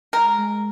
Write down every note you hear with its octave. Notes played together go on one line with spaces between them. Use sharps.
G#3 A#4
G#3